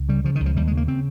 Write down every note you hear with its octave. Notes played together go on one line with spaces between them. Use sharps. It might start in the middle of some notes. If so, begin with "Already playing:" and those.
Already playing: C#2
C#3 G3
C#3 F3
D#3
C#2
F3
D#2 G3
G#3
C#3
A#3
C#3 C4